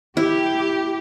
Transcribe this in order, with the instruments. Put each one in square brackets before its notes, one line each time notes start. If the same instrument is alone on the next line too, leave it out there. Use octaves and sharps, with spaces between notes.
[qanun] E4 [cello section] G4